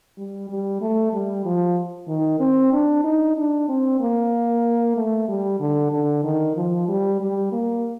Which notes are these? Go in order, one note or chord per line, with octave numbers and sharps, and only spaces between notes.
G3
G3
A3
G3
F3
D#3
C4
D4
D#4
D4
C4
A#3
A3
G3
D3
D3
D#3
F3
G3
G3
A#3